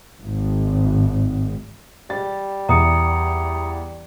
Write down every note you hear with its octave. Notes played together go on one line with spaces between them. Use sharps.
G#1
G3 A6
E2 A#5 D#6 C#7